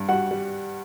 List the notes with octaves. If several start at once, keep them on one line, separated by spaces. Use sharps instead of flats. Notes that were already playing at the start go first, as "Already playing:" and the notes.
Already playing: G2
G3 F#4 F#5
G3